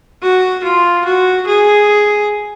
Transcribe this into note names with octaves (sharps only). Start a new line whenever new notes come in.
F#4
F4
F#4
G#4